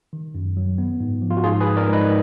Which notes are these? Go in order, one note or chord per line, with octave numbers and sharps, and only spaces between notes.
D#3
F#2
F#3
B3
G#2
F3
F4
F#4
G#2 F4 G#4
G#4 B4
G#2
A#4 D5
G#2
B4 D#5